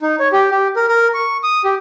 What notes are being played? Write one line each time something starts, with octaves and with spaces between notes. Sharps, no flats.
D#4
C#5
G4
G4
A#4
A#4
C#6
D#6
G4